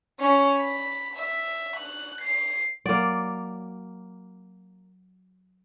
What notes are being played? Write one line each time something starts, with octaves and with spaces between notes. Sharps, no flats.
C#4
B5
E5
F#6
C7
F#3 A#3 D5 F#5